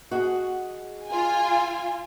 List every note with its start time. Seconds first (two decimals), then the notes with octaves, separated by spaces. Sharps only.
0.11 F#4 G#4 D#5
1.06 F4 G#5